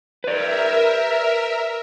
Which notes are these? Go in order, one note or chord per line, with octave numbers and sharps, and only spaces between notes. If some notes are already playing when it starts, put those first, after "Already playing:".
A#4 B4 D5 E5